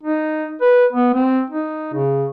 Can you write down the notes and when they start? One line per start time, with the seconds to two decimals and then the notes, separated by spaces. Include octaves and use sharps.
0.03 D#4
0.62 B4
0.93 B3
1.15 C4
1.50 D#4
1.94 C#3